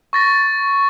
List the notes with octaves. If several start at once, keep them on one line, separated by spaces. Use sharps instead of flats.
C#6 A6 A#6